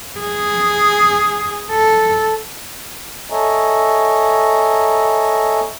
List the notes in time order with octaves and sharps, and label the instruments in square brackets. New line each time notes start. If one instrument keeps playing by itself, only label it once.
[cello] G#4
A4
[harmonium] A4 C#5 D#5 E5 G#5 A#5